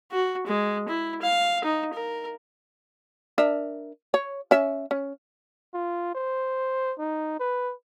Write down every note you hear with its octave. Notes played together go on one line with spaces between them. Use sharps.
F#4
G#3
E4
F5
D#4
A#4
D4 A#4 E5
C#5
C#4 E5
C#4
F4
C5
D#4
B4